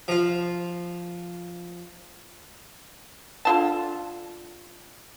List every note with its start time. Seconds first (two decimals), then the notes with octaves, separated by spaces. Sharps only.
0.08 F3 F4
3.45 D3 F4 A5